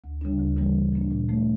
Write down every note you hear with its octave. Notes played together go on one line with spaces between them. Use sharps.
D2
C#3 G3 D4
D2
C#3 E3 G3 A#3
A#2
F3 A#3 D4
A#2
F3 A3